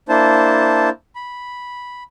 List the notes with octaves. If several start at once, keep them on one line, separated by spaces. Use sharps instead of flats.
A#3 D4 E4 C5 A5
B5